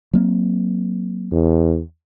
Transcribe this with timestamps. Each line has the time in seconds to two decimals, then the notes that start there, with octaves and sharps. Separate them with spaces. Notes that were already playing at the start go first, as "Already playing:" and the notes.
0.13 F#3 A#3 C4
1.32 E2